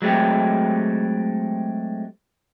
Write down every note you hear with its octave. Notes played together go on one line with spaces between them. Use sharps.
F#3 G#3 A3 C4 G4